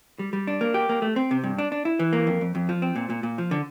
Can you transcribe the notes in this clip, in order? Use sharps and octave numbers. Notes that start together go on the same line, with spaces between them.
G3
G3
D4
A#3
G4
A#3
A3
C4
C3
G2
D4
D4
E4
E3
A#3
F2
F2
F2
F3
C4
A#2
A#2
A#2
F3
D3